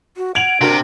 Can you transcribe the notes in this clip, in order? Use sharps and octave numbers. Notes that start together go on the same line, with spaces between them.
F#4
F#5 G#6 D7 F7 F#7
C3 D4 F#4 A#4